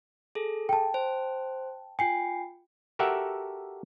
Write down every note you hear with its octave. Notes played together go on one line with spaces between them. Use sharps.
G#4 A4
G5 A5
C5
F4 G5 G#5 C7
F#4 G4 A4 A#4 E5 F#5